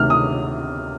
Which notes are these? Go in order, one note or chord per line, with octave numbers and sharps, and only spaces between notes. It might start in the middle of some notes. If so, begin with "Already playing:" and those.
Already playing: D2 C3 D#3 F6
D#6